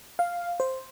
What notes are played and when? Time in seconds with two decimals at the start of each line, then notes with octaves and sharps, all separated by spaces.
0.19 F5
0.60 C5